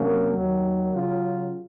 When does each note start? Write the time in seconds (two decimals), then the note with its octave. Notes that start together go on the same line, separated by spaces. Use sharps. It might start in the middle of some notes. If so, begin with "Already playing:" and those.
Already playing: C3 F#3 A#3 C#4
0.32 D#2 D#3 F#3
0.92 C#3 F#3 C#4 F4